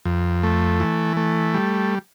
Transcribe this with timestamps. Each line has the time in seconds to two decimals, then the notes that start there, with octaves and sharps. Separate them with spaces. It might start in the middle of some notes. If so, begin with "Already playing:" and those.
0.05 F2
0.43 A3
0.80 E3
1.17 A3
1.54 G3